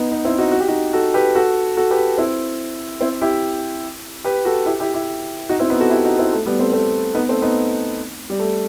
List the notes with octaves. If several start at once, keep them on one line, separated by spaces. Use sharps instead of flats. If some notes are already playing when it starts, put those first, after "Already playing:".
Already playing: B3 D#4
B3 D#4
C4 E4
D#4 F#4
F#4
G4
D#4 F#4
F#4 A4
G4 B4
F#4 A4
F#4 A4
G4 B4
C4 E4
C4 E4
E4 G4
G4 B4
F#4 A4
E4 G4
E4 G4
E4 G4
D#4 F#4
C4 E4
B3 D#4
F#4 A4
E4 G4
D#4 F#4
C4 E4
A3
G3 B3
A3 C4
A3 C4
B3 D#4
A3 C4
B3 D#4
G3
A3